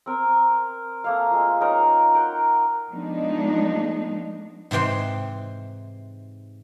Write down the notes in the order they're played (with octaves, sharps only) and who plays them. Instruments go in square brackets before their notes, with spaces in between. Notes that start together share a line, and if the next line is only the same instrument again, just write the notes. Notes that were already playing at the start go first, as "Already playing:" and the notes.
[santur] C4 A#4
A3 A#3 F5
G#3 F4
C#4 D#4 A#4
C5 F#5 G5 A#5
[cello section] F3 G#3 A3 B3 D4 D#4
[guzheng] G#2 C3 E3 G5 C6